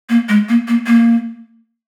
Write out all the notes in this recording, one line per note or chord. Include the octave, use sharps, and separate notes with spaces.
A#3
G#3
A#3
A#3
A#3